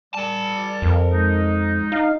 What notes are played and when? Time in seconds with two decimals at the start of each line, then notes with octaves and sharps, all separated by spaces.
0.14 G3 A#4 D5 A5
0.82 F2
1.12 G#3 D#4
1.92 D#4 F5